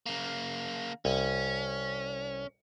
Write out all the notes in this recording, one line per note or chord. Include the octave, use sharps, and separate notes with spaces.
C#3 A#3
C2 C#4